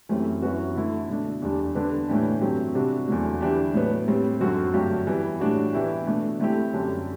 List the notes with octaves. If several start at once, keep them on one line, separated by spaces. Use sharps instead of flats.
F#2 E3 A3 C4 G4
F#2 E3 B3 F#4
D3 A3 E4
B2 A3 D4
E2 D3 G3 D4
D3 G3 B3 D4
A2 E3 B3 D4 G4
G2 F#3 A3 C4 G4
C3 G3 D4 F#4
E2 D3 F#3 A3
E3 G3 D4 G4
A2 F#3 B3
A2 G3 C4
F#2 D3 F#3 C4 F#4
G2 F#3 A3 D4 G4
E3 G3 B3
A2 G3 D4 F#4
E3 B3 E4 G4
B2 A3 D4
D3 A3 C4 E4 G4
F#2 D3 G3 D4 G4